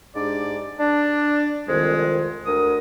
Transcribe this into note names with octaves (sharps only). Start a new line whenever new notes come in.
G#2 D4 G4 D5
D4
C2 F2 D#3 G#3
D2 D3 A#4 D#6